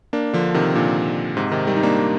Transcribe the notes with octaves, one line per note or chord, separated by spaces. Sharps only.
A#3 D4
D3 F3
C3 D#3
A#2 D3
G#2 C3
C3 D#3
D#3 G3
D#4
A#3 D4